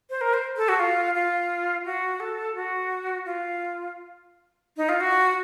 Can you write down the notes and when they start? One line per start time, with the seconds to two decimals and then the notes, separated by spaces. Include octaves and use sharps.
0.10 C5
0.21 A#4
0.34 C5
0.57 A4
0.69 F#4
0.80 F4
1.15 F4
1.85 F#4
2.20 A4
2.55 F#4
3.26 F4
4.77 D#4
4.89 F4
5.00 F#4